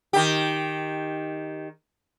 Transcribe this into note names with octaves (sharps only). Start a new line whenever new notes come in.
D#3 G4